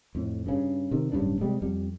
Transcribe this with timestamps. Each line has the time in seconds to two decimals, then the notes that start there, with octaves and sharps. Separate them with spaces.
0.15 F2 A2
0.46 G2 C#3
0.91 C3 D#3
1.12 D1 G2 C#3 D4
1.41 C3 G3 G#3
1.62 F2 G3